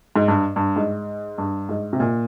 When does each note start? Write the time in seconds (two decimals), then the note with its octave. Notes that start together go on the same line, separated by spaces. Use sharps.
0.16 G#2
0.28 G2
0.56 G2
0.76 G#2
1.38 G2
1.69 G#2
1.93 C3
2.00 A#2